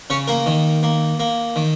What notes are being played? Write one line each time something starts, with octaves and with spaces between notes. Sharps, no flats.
C#3 C#4 C#5
A#3 A#4
D#3
A#3
A#3
D#3